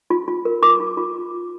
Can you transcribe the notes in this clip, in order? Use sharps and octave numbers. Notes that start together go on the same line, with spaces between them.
F4
F4
A#4
A#4 D6
F4
F4